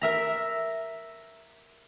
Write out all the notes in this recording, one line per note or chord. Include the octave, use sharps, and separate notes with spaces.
A#4 E5 A#5